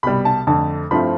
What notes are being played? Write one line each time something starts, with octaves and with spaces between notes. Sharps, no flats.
C2 B2 G3 B5
A5
F2 D3 A3 A5
G2 F3 A3 C4 E4 B5